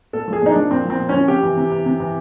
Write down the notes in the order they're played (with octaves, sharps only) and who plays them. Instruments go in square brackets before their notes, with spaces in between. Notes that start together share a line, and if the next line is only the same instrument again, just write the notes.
[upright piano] A#2 A4
F3
G#4
A#2 D#4
F3 D4
A#2 C4
F3 C4
A#2
C#4
F3
C3 G4
E3
C3
E3
C3
E3